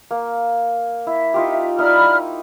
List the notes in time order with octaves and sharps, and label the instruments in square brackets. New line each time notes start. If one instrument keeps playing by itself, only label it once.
[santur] A#3
[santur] E4 [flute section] E5
[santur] D#4 F4 G4
[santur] D#4 E4 D#6 [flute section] D5 B5 F6